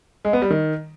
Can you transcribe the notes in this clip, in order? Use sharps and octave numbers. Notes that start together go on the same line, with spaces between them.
G#3
B3
G3
D#3